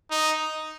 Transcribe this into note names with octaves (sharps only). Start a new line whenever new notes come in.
D#4